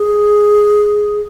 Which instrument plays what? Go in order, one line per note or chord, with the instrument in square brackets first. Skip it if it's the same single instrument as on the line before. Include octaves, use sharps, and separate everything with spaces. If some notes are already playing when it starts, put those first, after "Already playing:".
Already playing: [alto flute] G#4